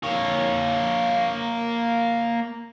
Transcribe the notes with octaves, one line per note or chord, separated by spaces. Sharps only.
A#3 C#5